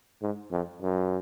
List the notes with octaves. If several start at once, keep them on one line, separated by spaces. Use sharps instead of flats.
G#2
F2
F#2